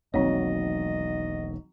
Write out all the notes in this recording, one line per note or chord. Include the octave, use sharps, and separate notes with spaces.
E1 B1 D#3 F#3 A#3 C4 C#5 D#5